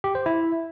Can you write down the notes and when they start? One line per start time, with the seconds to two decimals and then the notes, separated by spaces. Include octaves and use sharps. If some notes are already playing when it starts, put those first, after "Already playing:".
0.04 G4
0.15 C5
0.26 E4